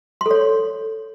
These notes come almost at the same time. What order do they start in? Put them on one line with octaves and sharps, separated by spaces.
C6 A4 C#5